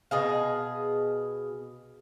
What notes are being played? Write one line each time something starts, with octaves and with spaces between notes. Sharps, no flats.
B2 G#4 F5